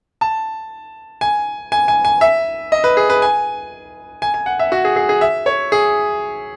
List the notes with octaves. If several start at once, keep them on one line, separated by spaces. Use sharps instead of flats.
A5
G#5
G#5
G#5
G#5
E5
D#5
B4
G#4
B4
G#5
G#5
G#5
F#5
E5
F#4
G#4
G#4
G#4
E5
C#5
G#4